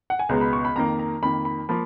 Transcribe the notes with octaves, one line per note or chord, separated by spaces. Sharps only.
F#5
G#5
C#2 B2 G#3 B3 A#5
B5
C#6
B5
F2 D#3 A#3 A#5
A#5
F2 D#3 A#3 B5
B5
F3 A#3 B5